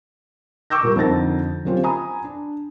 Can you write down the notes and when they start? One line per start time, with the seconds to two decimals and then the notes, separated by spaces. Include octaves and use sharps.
0.70 C#6 D6 E6 G6 A#6
0.83 A#2 G3 A#4
0.96 F2 D3 D#4 A6 A#6
1.65 F#3 A#3 C4 C#4 F4 G4
1.83 G#5 A#5 B5 D#6
2.24 D4